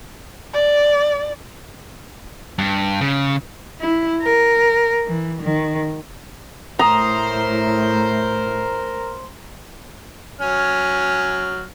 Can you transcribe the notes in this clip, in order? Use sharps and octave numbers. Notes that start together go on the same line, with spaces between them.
D5
G2
C#3
E4
A#4
E3
D#3
A2 A#4 C5 A#5 D#6
F#3 C#4 F6